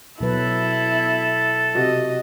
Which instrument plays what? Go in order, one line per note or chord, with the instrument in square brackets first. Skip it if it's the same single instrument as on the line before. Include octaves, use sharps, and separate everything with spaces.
[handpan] B2 F#3 B4 [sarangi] E4 [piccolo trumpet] A4
[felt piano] C3 F#4 G4 [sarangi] D#5